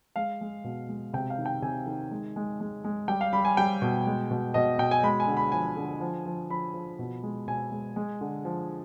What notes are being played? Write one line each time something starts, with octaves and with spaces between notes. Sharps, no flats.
G#3 F5
G#3
B2
G#3
C3 G5
F5
D#3
G5
C3 G#5
D#3
G#3
G#3
G#3
G#3
G3 G5
F5
G3 B5
G#5
G3 G5
B2
G#3
B2
B2 D#5
B2 G5
G#5
G#3 B5
G#5
D3
B5
F3 G#5
D3
F3
F3
F3 B5
F3
B2
G#3
B2 G#5
G#3
G#3
D3
F3